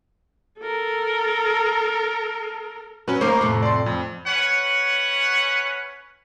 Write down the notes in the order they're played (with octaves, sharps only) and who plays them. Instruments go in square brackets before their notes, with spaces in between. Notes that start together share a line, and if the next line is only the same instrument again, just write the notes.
[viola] A4 A#4
[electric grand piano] F#3 C#4 [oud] B4
[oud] A#3 D#4 A#4 [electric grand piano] C5 C#6 D6
[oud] F2 A2 C3
[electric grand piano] D5 C6
F2
[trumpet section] C#4 B4 C#5 F#5